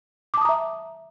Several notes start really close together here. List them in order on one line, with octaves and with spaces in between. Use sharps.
D6 A5 D#6 A#5 E5